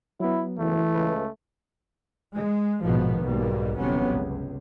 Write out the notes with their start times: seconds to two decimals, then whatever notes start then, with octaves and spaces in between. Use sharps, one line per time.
0.20 F#3 B3 E4
0.58 F#1 E3 A3
0.95 C#2 B4
2.34 G#3
2.84 A#1 G#2 B2 D#3 F3 B3
3.22 B1 G#2 B2 G3 A#3
3.79 G1 E2 C3 F#3 B3 C#4
4.13 C#2